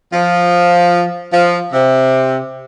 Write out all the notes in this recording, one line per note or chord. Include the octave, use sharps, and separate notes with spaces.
F3
F3
C3